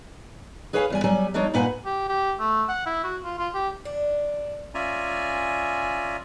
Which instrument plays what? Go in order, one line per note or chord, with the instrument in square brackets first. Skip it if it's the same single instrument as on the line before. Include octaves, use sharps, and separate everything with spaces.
[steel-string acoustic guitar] G#4 B4 C#5 F5 F#5 G#5
E2 G3 G#5
F#3 G3 G#5
F3 G3 D4 D#4 C#5
G2 A#2 A#3 B4 F#5 G#5
[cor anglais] G4
G4
A3
F#5
E4
F#4
F4
F4
G4
[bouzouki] D4
[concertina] C#4 F4 D5 E5 G#5 A#5